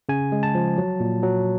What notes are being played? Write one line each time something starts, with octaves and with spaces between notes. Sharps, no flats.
C#3 G#5
G#3
A5
F3
F#3
A#2
F#3